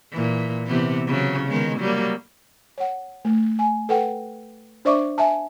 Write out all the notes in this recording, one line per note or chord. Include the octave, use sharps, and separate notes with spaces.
A#2 E3
C3 E3 B3
C#3 F#3
D#3 G#3 B3
F#3 G3 A#3
C#5 F#5
A3
G#5
A4 B4 F#5 G5
D4 C5 D5 E5 C#6 D6
E5 G#5 A5